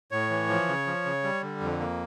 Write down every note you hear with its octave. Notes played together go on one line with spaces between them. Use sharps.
A2 C#5
E3
F3
C#3
F3
C#3
G3
D3
F2
A#3